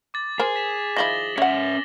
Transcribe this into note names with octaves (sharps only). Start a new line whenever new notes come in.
D6 A6
G#4 A#4 C5
B6 E7
D#3 F3 E4 A#6 F#7 G7
C#4 C#5 E5 F#5